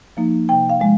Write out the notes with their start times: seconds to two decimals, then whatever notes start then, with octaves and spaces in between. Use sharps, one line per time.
0.17 F3 A#3 D#4
0.49 C3 G5
0.70 F5
0.80 F3 G#3